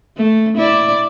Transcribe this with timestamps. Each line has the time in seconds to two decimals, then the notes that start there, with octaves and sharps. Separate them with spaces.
0.17 A3
0.57 E4 D5